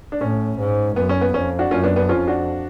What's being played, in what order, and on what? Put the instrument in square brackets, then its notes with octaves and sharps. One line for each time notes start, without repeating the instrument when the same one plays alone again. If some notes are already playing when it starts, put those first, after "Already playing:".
[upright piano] D4
[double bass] A2 [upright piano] C#4
[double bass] G#2
[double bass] F#2 [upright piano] B3
[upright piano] C#4
B3
[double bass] F2 [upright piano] C#4
[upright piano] D4 F#4
[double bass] F#2 [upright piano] C#4 F4
[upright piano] B3 D4
B3 D4
[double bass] F2 [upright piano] C#4 F4
[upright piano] D4 F#4